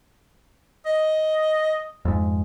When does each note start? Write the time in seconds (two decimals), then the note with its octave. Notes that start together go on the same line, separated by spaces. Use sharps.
0.86 D#5
2.05 F2 G#2